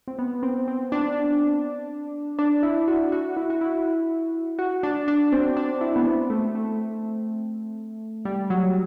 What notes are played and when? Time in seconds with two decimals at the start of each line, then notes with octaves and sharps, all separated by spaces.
0.08 C4
0.19 B3
0.43 C4
0.68 C4
0.92 D4
2.39 D4
2.63 E4
2.88 F#4
3.12 F#4
3.37 E4
3.50 F#4
3.61 E4
4.59 F#4
4.83 D4
5.08 D4
5.32 C4
5.57 D4
5.81 E4
5.96 B3
6.06 C4
6.30 A3
6.55 A3
8.25 G3
8.50 F#3